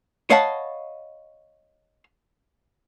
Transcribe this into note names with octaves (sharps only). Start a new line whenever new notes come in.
C#5 D#5 F5 F#5 A5 B5